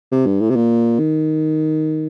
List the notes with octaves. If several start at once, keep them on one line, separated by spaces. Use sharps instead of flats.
C3
G2
A2
C3
A#2
D#3